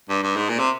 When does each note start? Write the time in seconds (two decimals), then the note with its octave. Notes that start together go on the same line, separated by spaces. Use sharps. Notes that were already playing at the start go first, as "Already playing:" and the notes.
0.09 G2
0.23 G2
0.36 G#2
0.49 A#2
0.59 C3